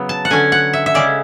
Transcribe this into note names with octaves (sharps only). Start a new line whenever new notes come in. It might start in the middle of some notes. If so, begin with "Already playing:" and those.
Already playing: C#3 F#3 B3
A5
F#5
D3 F#3 C#4 G#5
F#5
E5
E5
C#3 G#3 C#4 D5